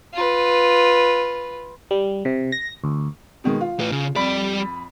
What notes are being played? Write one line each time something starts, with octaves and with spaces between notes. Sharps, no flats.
F4 B4
G3
C3
A#6
D2
B2 D#3 G#3
F4
A2 B4
C#3
F2 G3 D5 B5 B6